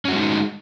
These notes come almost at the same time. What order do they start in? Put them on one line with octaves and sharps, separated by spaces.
C#4 F#4 G#3 D#4